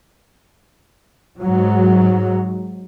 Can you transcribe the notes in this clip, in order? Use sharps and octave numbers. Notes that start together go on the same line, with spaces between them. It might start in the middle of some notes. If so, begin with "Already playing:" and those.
G#2 F#3